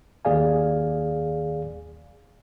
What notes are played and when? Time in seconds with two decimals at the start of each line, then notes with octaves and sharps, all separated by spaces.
0.25 D#2 G#4 D5 F5 G#5